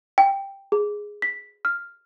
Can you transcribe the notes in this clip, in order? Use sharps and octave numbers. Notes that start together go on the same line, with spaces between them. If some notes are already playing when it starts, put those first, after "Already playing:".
G5
G#4
B6
F6